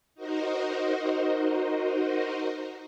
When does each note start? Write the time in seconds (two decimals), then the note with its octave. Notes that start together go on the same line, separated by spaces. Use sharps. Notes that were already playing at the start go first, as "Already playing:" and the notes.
0.15 D#4 F#4 A#4 C5 D#5